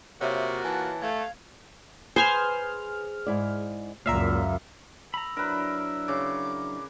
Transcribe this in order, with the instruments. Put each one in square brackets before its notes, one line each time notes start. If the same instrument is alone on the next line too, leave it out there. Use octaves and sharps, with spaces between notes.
[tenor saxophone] C3 [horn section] A#3 F4 F#4 [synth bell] C#5 E5
[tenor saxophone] E3 [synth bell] G#5 [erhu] A5
[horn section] A3 [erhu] F5 [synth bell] G#6
[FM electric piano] G#4 F6 [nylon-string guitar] B4 [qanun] C5 G#5
[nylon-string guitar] G#2 E4 D5
[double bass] C#2 F#2 [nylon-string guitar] A#2 [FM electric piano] A#4 E5 F5
[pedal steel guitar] A#5 B5 [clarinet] E6
[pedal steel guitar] F#3 D4 E4 [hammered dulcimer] A#4 B4 [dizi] B5
[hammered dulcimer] C#3 [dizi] D6